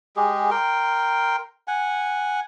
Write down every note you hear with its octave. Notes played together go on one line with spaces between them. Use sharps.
G#3 G4 G#4
A#4 G5 C6
F#5 G#5